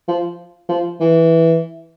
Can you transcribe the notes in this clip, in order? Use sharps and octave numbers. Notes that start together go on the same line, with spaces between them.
F3
F3
E3